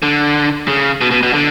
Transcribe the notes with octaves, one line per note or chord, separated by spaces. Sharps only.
D3
C#3
B2
B2
B2
D3